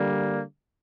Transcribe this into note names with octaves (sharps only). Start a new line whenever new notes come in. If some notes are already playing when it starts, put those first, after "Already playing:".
Already playing: D3 G3 A#3